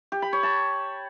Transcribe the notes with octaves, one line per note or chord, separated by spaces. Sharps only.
G4
B5
C#5
A5